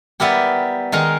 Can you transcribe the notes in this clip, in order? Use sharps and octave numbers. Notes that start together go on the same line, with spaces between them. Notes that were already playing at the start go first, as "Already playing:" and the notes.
G3 B3 E4 G4 A#4
D#3 G#3 D#4 A#4